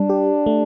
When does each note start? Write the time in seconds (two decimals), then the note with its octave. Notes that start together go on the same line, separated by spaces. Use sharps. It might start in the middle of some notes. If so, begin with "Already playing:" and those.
Already playing: G3 D4
0.09 G4
0.46 A3